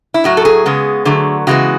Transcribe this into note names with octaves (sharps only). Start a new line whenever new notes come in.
E4
A2 F#3 A3 F#4
A4
G#4
C#3 G#3 B3
D3 F#3 A3
C#3 E3 G#3 B3 F#4